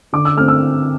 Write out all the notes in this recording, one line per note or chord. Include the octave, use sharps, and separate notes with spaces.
D3 D6
E6
A3 C4 F6
E6